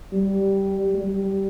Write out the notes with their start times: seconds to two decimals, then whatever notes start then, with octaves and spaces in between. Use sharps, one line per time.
0.13 G3
0.95 G3